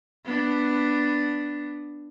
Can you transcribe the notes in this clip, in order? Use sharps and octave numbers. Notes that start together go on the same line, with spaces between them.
B3 D4